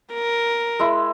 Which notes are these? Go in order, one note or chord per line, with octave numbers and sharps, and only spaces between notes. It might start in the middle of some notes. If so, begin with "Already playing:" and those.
A#4
G#3 E4